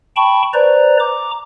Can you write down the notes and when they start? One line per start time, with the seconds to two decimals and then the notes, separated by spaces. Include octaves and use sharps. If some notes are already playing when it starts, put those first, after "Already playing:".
0.16 G5 A5 B5 C#6
0.54 B4 C5 D5 A#5
0.99 A#5 D6